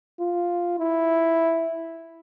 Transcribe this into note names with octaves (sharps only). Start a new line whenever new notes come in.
F4
E4